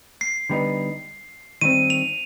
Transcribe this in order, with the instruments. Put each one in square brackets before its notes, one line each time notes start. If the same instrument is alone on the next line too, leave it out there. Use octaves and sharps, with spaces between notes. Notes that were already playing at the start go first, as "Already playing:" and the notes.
[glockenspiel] C7
[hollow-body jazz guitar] D3 G3 B3 D#4
[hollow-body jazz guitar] D#3 G3 C4 [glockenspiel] D#7
[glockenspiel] F7